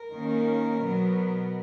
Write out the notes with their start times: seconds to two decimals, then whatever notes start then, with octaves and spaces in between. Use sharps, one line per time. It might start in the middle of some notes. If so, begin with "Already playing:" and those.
Already playing: A#4
0.13 D#3 A#3 C#4
0.83 B2 F#3 B3